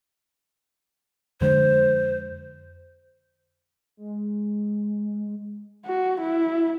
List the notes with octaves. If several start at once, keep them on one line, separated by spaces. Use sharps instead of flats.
F2 D3 G#3 C5
G#3
F#4
E4